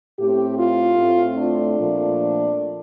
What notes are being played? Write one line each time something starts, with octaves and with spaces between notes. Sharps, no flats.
A2 A3 C4 G4
F4
A2 A3 C4
D4
A#2 F3 A3